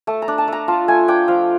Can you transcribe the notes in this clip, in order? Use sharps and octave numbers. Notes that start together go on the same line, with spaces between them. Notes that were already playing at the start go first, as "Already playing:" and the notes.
A3 A5
A#5
D4
A5
A3 A#5
F4 A5
A3 G#5
D4 G5
F3 F5